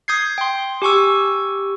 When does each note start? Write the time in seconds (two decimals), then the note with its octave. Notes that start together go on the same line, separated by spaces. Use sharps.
0.08 D#6 G6 G#6 C7
0.38 G5 C6
0.82 G4 G#5 C#6 E6